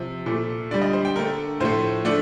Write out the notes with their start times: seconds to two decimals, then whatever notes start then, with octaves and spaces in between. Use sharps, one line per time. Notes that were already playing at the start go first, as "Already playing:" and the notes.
Already playing: C3 F3
0.26 A#2 A3
0.71 D3 D5
0.74 G3
0.82 D#5
0.93 C5
1.05 G5
1.15 D3 A3 A#4
1.60 A2 F3 A3 C5
2.05 D3 F3 A3 D5